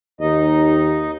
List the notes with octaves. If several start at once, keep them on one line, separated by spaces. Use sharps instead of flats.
D#2 D#4 D#5